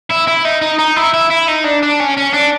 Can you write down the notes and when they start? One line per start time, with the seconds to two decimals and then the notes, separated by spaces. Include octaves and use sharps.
0.10 E4
0.27 E4
0.45 D#4
0.61 D#4
0.79 D#4
0.96 E4
1.14 E4
1.30 E4
1.48 D#4
1.65 D4
1.83 D4
2.00 C#4
2.17 C#4
2.33 D4